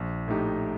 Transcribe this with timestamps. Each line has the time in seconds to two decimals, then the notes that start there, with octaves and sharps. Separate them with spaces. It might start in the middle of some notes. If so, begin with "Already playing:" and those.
Already playing: A#1
0.28 A2 A3 D#4 G4